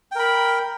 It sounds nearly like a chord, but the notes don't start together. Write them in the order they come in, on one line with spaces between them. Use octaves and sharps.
G5 A#4 B5